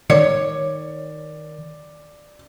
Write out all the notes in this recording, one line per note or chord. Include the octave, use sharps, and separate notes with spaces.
D#3 C#5 D5